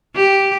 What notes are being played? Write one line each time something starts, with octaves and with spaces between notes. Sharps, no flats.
G4